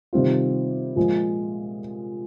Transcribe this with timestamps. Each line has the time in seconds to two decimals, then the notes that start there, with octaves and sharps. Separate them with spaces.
0.13 C3 D#3 G3 C4 F4
0.96 A#2 F3 G#3